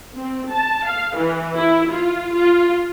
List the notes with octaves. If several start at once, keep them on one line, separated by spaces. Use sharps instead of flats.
C4
A5
F5
E3
E4
F4
F4